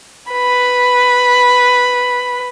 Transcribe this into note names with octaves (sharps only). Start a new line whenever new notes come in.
B4 B5